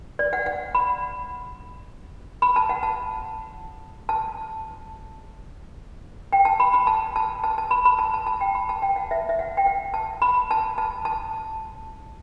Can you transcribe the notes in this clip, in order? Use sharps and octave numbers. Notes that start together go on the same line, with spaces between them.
D5
F#5
F#5
B5
B5
A5
F#5
A5
A5
G5
A5
B5
B5
A5
A5
A5
A5
B5
B5
A5
A5
A5
G5
B5
A5
G5
F#5
E5
E5
F#5
G5
F#5
A5
B5
A5
A5
A5